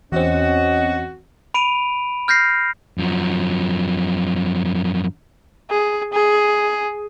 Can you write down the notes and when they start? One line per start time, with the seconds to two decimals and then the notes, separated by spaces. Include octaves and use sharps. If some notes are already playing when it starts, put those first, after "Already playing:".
0.12 E2 C4 C#4 F#4 D#5
1.54 B5 D7 D#7 F7
2.28 F6 G6 A#6 C7
2.98 F#2 F3
5.70 G#4
6.13 G#4